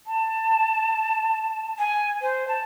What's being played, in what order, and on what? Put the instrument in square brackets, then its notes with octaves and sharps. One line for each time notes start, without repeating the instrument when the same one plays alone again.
[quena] A5
G#5
C5
A5